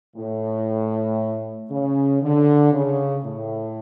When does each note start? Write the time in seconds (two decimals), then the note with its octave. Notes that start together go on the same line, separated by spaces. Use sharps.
0.16 A2
1.70 C#3
2.23 D3
2.73 C#3
3.24 A2